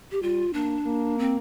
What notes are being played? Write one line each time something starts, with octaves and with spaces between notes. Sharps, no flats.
G4
G3 F4
A#3 D4
A#3
C4